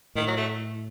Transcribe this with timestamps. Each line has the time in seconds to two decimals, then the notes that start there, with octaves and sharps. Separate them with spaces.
0.15 A2 D#3
0.27 F#3
0.37 A3